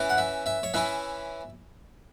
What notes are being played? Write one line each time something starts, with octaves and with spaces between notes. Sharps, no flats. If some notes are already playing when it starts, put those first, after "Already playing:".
Already playing: E3 C#4 E4
F#5
E5
E5
C#5
E3 C#4 E4 E5